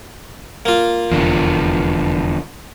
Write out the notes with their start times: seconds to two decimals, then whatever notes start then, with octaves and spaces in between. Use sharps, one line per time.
0.66 A#3 F4
1.12 F1 E2 D3 F3